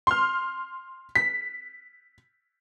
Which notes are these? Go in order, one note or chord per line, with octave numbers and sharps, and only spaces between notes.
C6 F6
B6